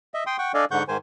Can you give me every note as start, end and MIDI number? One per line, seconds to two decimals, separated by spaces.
0.14 0.24 75
0.14 0.24 76
0.27 0.37 79
0.27 0.37 84
0.27 0.37 87
0.39 0.52 78
0.39 0.52 79
0.39 0.52 85
0.54 0.65 62
0.54 0.65 69
0.54 0.65 74
0.54 0.65 75
0.54 0.65 77
0.54 0.65 80
0.71 0.83 44
0.71 0.83 50
0.71 0.83 78
0.71 0.83 85
0.71 0.83 91
0.88 0.97 44
0.88 0.97 51
0.88 0.97 72
0.88 0.97 80